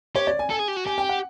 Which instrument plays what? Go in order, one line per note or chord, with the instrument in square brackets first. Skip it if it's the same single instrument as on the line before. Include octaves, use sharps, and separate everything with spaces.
[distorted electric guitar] G4 [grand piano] C#5
[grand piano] D5
G#5
[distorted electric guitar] A4 [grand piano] G#5
[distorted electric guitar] G#4
G4
F#4
[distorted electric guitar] G4 [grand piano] G#5
[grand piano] G5
F#5